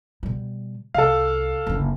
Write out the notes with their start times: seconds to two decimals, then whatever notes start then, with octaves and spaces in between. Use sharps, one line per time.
0.23 B2 G3
0.94 C2 A4 F5
1.67 F#1 D3